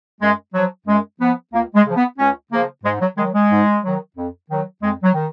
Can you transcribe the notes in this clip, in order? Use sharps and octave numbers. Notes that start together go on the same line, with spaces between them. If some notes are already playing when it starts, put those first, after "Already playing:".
F#2 G#3
F3 F#3
F#2 G#3
F3 B3
C#2 A#3
G#3
C#3 F3
B3
C#2 C#4
C#3 F3 A#3
G#2 G#3
F#3
D#3 F#3 G#3
G#3
G#2
D#3 F#3
F2
D#3 F#3
F2 G#3
F#3
D#3